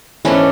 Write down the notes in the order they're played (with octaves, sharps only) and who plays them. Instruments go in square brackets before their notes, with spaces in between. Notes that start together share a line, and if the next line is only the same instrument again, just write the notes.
[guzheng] G#2 E3 A3 D4 F#4 [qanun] C#4 E4